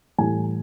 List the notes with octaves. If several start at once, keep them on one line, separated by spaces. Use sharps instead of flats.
A2 E3 G3 G#5